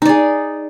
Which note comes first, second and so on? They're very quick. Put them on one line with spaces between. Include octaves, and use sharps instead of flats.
D#4 D5 G#4